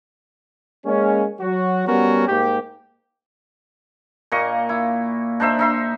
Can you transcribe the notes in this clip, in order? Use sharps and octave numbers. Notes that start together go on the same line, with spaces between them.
G#3 A#3 C#4
F#3 F#4
G3 B3 C#4 F#4 A#4
G#2 A#3 G4
A#2 A#3 D#5 C#6
E4
D4 D#4 C5 E5
D#4 E5 C6